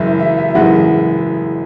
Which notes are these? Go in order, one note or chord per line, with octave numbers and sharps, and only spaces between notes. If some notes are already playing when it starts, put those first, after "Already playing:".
Already playing: F#1 F#2 E3 G#3 E5
E5
E5
E5
F#1 F#2 E3 G#3 F#5